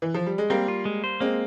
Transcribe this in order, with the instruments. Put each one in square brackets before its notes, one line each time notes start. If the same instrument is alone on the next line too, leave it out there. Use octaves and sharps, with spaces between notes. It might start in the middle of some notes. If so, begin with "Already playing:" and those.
[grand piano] E3
F3
G3
G#3
[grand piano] G3 A#3 [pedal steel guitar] C4
[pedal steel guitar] F4
G#3
C5
[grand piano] G#3 C4 [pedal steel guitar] A#3